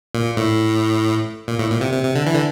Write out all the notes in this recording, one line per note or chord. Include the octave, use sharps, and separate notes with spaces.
A#2
A2
A#2
A2
A#2
C3
C3
C3
D3
E3
D3